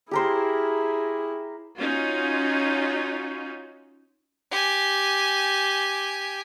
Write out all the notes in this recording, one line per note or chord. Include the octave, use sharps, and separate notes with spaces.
E4 G4 G#4 A#4 C5
C#4 D#4 F4 F#4
G4 G#5